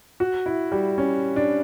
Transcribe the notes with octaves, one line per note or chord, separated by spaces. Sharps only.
F#4
E4
G3
C#4
D4